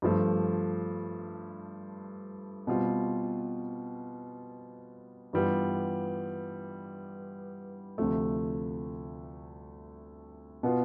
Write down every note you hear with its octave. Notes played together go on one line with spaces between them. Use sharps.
G2 F3 A3
B2 G3 C4 F4
G2 E3 G3 B3 F4
D2 C3 F3 A3
B2 B3 F4